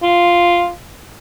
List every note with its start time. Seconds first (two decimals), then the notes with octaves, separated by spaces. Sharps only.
0.03 F4